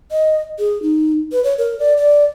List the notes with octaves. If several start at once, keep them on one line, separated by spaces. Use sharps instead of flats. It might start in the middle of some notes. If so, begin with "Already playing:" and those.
D#5
G#4
D#4
B4
C#5
A#4
D5
D5